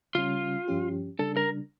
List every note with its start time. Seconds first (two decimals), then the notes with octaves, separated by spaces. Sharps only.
0.15 C#3 G3 C#4 F4
0.68 G2 F3 C#4 G4
1.19 C#3 G3 D4 A4
1.37 A#4